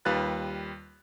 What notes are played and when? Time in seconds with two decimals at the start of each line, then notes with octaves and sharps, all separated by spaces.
0.05 D#2 G3 F4 B4 F#6 A6